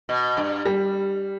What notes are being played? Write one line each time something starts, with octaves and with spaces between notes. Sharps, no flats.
B2
G2
G3